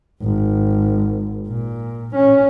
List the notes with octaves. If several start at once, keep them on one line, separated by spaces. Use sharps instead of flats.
G#1
A#2
C#4